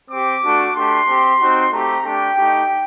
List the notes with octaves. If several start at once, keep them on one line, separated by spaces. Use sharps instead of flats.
C4 G4 D6
A3 D4 F#4
A3 D4 G4 C6
C4 G4
C4 D#4 F#4
A3 C4 G4 A#5
A3 D4 G4 G5
A3 D#4 G4